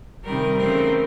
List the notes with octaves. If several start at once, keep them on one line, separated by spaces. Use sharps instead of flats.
C3 D#3 G3 A#4
C#3 E3 A3 C4 A#4